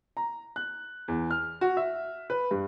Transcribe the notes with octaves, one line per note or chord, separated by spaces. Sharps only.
A#5
F#6
E2
F6
F#4
E5
B4
G2